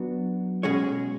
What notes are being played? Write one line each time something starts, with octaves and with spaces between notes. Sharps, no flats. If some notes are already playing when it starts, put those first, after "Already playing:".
Already playing: F#3 B3 D4 F#4
B2 G#3 C#4 G#4 C#5